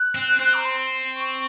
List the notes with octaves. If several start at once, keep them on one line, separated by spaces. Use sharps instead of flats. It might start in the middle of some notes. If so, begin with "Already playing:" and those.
Already playing: F#6
C4
C4
A#5
C6
C#6